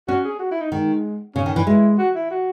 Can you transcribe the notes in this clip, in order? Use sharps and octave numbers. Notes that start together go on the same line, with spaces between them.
C#4 F#4
G#4
F#4
E4
D#4
D#3 G#3
C#3 C#4
D#3
E3
G#3 E4
F#4
E4
F#4